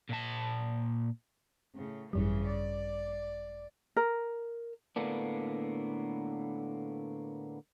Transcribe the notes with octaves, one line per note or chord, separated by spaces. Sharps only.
A#2 A5
A2 C#3
G#1 F#2 C#3 E3 G3
D5
A#4
A2 D3 A#3 B3 D4